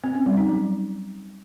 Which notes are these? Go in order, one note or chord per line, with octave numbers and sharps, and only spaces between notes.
C4
C#4
G3
D#4
F#3